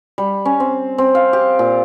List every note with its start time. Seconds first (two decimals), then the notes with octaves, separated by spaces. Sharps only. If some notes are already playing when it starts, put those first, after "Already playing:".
0.18 G3
0.45 C#4
0.60 C4
0.98 C4
1.15 F5
1.33 G4
1.59 A#2